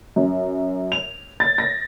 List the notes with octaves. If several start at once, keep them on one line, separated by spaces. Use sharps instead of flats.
F#2
F7
A6
A#6